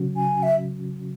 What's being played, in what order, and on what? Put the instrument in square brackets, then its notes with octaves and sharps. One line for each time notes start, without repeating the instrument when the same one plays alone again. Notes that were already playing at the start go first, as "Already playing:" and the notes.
Already playing: [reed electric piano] C#3 F#3 C#4 F#4
[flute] G#5
E5